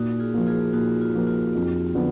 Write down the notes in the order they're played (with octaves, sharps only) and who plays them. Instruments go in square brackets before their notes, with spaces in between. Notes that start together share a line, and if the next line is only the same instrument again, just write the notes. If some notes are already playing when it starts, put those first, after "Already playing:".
Already playing: [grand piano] A#2 [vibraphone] D#4 F#4
[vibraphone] F4 G#4
[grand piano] F3 A#3
[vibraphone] F4 G#4
[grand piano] A#2 [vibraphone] D#4 F#4
[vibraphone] F4
[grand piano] F3 A#3
[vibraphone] F4
[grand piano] F2
D3 F3 B3